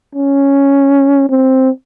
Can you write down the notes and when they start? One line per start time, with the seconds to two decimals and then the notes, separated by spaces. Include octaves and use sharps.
0.15 C#4
1.29 C4